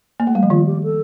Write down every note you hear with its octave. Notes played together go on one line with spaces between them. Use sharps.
A#3
A3
G3
F3
D#3 F4
G4
A4